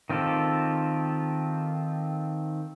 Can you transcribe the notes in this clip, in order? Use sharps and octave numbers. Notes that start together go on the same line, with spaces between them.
D#3 C4 F4 G4 A4